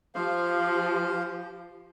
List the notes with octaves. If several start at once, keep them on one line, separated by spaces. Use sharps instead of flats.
F3 G4 C5 F5